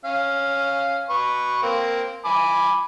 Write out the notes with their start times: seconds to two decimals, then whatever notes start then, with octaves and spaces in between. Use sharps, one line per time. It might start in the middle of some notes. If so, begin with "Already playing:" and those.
0.05 C#4 F5
1.10 B4 C#6
1.62 A#3 C4
2.25 G#5 B5 D6